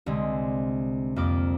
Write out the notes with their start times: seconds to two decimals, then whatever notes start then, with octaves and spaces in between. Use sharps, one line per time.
0.06 C2 D3 G#3
1.16 F2 A#3 D6